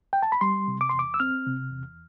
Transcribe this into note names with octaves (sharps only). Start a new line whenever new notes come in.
G5
A5
B5
G3 C6
C3
D6
C6
E2
D6
E6
C4 F6
C3
E2